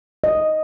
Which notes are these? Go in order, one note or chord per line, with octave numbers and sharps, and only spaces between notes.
D#5